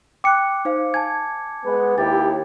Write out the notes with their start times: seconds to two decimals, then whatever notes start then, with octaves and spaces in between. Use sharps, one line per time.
0.24 G5 D6 F#6 C#7
0.65 D#4 C5 F5
0.94 G#5 A5 G#6
1.65 G#3 B3
1.98 D#2 E4 G4 A6